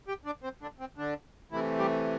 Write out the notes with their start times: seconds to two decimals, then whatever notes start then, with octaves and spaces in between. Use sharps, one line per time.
0.08 G4 G5
0.26 D4 D5
0.43 C4 C5
0.62 D3 D4
0.80 C4
0.98 D3 D4
1.52 C3 E3 A3 E4
1.78 G3 G4